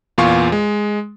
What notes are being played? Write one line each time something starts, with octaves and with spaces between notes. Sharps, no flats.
E2 A#2 F4 F5 C6 C#6
G#3